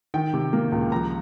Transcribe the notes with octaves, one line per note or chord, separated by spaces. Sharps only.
D#3 G5
C3
A#3
C#2
F3 A#5